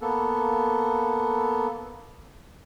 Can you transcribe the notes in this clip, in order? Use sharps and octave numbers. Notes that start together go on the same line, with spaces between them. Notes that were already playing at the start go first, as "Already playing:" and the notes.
A#3 B3 A4